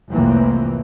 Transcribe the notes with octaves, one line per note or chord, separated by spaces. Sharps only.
F1 C2 A2 E3 A#3 C4